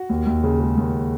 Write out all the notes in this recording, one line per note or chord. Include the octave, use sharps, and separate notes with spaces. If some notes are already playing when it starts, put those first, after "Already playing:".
Already playing: F#4
D#2
D#2
C#3
G#3
D#2